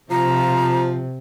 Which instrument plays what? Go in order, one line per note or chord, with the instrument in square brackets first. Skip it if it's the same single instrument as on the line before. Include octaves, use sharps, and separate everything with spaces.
[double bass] C3 [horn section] F3 [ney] A#5